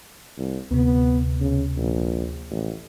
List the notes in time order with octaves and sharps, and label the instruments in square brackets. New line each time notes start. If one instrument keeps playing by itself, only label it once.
[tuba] C2
[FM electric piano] D2 C3 [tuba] B3
[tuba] C#3
A#1
A1